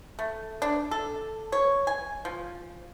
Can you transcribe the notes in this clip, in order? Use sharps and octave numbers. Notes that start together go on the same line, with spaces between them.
A3
D4
A4
C#5
G#5
F3